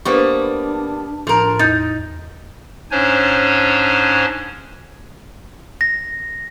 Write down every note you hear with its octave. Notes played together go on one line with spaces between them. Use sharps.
G3 A#3 B3 D4 B4 C5 C#6
A2 F3 A#4
E2 D#4 G6 A6
G#2 C#4 D4 C5 C#5 G#5
A#6